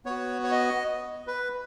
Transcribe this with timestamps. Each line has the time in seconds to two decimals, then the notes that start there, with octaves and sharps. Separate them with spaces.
0.05 B3 F#4 C#5
0.44 C#5
0.52 D#5
1.27 B4